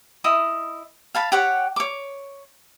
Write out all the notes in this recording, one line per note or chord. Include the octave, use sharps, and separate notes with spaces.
E4 D#5 D#6
F5 A5 B5
G4 C#5 F#5 G5
C#5 D6